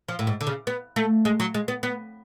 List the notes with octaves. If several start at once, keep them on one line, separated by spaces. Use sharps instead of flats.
F3
A2
G#2
D3
C#3
B3
A3
G#3
F#3
G#3
B3
B3